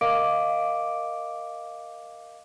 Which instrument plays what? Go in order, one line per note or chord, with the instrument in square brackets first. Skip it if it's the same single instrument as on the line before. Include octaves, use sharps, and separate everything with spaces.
[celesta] A#4 D#5 F5 D6 D7